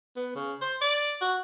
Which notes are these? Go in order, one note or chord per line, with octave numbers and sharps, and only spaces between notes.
B3
C#3
C5
D5
F#4